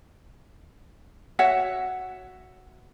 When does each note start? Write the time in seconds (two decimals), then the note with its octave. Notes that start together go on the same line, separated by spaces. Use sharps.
1.39 F#4 C#5 E5 F#5